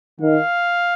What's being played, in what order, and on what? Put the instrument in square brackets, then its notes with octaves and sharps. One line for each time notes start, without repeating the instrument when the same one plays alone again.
[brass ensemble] D#3 [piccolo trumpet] F5